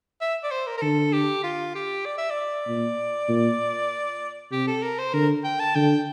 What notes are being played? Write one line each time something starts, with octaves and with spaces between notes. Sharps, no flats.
E5
D5
C5
A#4
A#4
D3 A4
G4
F4
G4
D5
E5
D5
A#2
A#2
C3 G4
A4
A#4
C5
D3 A#4
G5
A5
D3 G5